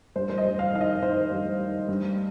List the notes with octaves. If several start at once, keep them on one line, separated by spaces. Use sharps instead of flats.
G2 C5
C5
D#5
G2
F5
D#3 F5
D#5
D#3 C5
G2
D#3
G2